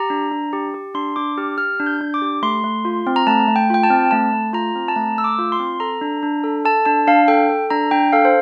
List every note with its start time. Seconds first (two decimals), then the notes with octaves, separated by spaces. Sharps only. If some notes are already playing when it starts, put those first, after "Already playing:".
Already playing: G4 A#5
0.10 D4
0.32 D4
0.53 G4
0.74 G4
0.94 D4 C6
1.16 D4 D6
1.38 G4 F6
1.58 G4 F6
1.80 D4
1.86 G6
2.01 D4
2.14 D6
2.22 G4
2.42 A3 C6
2.64 A3
2.85 F4
3.07 C4
3.16 A#5
3.27 A3 A5
3.48 A3
3.56 G5
3.70 F4 G5
3.83 A5
3.90 C4
4.11 A3 A5
4.33 A3
4.53 F4 A#5
4.75 C4
4.88 A5
4.96 A3 A#5
5.18 A3 E6
5.24 D6
5.39 F4
5.52 C6
5.60 C4
5.80 A4 A#5
6.01 D4
6.23 D4
6.44 A4
6.65 A4 A5
6.86 D4 A5
7.07 D4 F5
7.28 A4 G5
7.50 A4
7.70 D4 A#5
7.91 D4 G5
8.12 A4 F5
8.25 C5